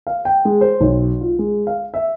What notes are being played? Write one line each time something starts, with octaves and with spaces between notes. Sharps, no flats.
F5
G5
G#3
C5
B1
F4
G#3
F5
E5